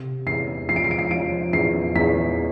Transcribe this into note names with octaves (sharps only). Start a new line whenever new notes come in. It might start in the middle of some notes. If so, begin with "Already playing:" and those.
Already playing: C3
E2 C7
F3 C7
D7
C7
D7
C7
F3 D7
E2 C7
E2 B6